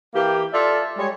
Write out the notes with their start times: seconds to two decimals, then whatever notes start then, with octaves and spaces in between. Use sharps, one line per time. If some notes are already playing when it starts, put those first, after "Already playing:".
0.15 E3 A#3 G4
0.53 F4 A4 D5 E5
0.98 G3 G#3 C#5